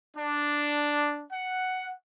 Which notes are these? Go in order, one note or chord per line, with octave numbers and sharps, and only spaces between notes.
D4
F#5